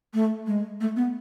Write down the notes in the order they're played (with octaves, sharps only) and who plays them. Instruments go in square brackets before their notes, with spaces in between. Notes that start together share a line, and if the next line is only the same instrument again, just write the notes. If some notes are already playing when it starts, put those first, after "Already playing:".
[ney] A3
G#3
A3
B3